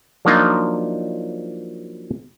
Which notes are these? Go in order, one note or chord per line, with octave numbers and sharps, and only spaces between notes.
F3 F#3 A#3 D4 D#4 F4